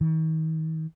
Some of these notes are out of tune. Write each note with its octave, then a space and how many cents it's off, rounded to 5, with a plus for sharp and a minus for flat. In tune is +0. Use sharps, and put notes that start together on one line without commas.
D#3 +40